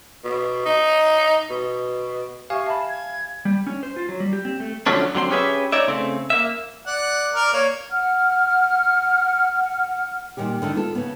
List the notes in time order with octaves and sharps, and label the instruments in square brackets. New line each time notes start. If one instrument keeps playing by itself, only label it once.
[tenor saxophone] B2
D#4
B2
[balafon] G4 E5 [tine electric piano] F5 G#5 [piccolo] C#6
[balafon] E5 B5 [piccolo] A5
[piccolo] G#6
[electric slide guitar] G3
C#4
C5
F4
F#3
G3
G4
C4
A3
[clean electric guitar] D3 F3 F#3 A3 C#4 D4
D3 F#3 C4 C6
C#4 G4 G#4 B4 E5
D#4 C#5 D5 E5
C#3 A3 C4
A#3 E5
[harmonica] D5 F#5
A#4 D5
A#3 C#5
[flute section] F#5 F6
[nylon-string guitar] A#2 D#3 G3 G4
D3 D#3 A3
B3 F4 A4
C#3 B3